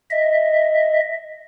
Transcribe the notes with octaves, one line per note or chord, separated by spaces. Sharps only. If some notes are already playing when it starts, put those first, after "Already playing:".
D#5 E5